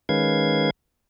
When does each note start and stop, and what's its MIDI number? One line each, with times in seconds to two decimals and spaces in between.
0.09 0.70 51
0.09 0.70 56
0.09 0.70 61
0.09 0.70 71
0.09 0.70 77
0.09 0.70 92